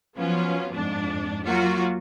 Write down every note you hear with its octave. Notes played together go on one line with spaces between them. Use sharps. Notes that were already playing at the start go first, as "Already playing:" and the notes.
F3 F#3 B3 C#4 F4
F2 G#2 D4
F#3 A#3 F4 F#4